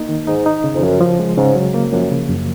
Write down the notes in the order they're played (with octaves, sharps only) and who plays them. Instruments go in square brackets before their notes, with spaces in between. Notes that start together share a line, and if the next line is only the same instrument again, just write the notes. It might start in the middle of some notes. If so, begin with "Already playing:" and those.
Already playing: [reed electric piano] A#3 D#4
D#3
[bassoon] G#2 [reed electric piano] D#4
[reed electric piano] D#4
C#3
[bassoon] F2
[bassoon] F#2 [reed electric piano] F3
[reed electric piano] F3
G#3
[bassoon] G#2 [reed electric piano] C#3
[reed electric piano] F#3
A#3
[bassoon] F#2 [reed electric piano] F3
[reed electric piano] C#3
F#2